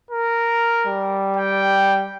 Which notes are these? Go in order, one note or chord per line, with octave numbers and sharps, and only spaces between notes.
A#4
G3
G5